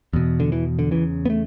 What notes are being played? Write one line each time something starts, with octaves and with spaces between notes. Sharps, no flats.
E2 B2
D3
E3
D3
E2 C#3 E3
B3
A3